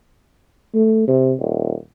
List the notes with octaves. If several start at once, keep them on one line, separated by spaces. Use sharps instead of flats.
A3
C3
D#1